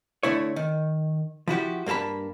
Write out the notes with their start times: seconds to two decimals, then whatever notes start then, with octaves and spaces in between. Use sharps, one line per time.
0.23 D3 A3 E4 C#5
0.56 D#3
1.48 F3 E4 F#4 G4
1.86 G2 A#3 A4 A5 B5